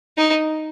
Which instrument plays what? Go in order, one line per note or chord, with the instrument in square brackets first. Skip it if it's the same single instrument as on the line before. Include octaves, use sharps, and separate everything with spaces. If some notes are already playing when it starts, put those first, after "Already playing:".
[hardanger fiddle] D#4